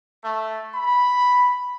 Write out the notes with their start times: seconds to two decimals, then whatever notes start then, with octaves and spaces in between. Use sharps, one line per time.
0.24 A3
0.75 B5